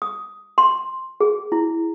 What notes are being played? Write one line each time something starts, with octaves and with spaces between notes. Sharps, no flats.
D#6
C6
G#4
E4